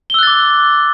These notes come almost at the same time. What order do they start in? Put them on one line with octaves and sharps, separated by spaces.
G7 E6 F#6 A6 D6